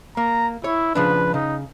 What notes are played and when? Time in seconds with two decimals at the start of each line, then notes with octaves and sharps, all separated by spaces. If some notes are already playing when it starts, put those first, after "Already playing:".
0.17 A#3 A#5
0.64 E4 C#5
0.95 C#3 F3 D4 B4
1.34 C#3 D#4